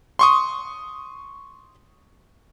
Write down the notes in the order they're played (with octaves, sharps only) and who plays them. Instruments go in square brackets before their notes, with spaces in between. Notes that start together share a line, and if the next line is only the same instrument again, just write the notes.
[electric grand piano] C6 C#6 D#6